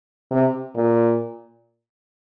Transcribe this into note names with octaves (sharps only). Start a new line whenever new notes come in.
C3
A#2